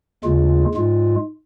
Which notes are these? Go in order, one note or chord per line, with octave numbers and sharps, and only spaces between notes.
D#2 C#3 G#3 F4
G#2 G#3 F4